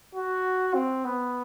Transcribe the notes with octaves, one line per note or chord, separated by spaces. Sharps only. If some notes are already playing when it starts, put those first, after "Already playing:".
F#4
C4
B3